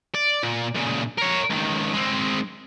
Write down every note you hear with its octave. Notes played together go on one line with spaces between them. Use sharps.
D5
A#2
A#2 C#3
A#4 C#5
C#2 D#3
G#3 C4